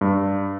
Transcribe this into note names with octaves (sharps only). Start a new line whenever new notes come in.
G2